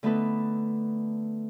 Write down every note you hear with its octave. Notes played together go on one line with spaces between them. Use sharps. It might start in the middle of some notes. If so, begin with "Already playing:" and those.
D3 A3 B3 D#4 A4 B4